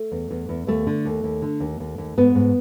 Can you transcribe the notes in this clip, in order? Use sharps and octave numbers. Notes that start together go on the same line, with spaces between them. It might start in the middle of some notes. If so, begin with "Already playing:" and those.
Already playing: A3
E2
E2
E2
D#2 A3
D3
D#2
D#2
D3
D#2
D#2
D#2
G#2 B3
G#2